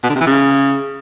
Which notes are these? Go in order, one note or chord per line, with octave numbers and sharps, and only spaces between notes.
B2
D3
C3
E3
C#3